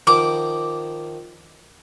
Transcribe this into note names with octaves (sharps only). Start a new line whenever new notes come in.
D#3 F3 F#5 D6